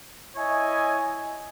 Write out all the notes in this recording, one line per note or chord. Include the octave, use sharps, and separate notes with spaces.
E4 C#5 D#5 G#5